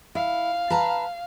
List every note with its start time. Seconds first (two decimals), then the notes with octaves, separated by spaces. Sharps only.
0.15 E4 F5
0.70 B4 A5 A#5